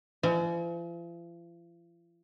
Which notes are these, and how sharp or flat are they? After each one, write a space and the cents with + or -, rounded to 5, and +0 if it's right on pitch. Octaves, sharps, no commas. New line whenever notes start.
F3 -45 D#4 +45 D5 +45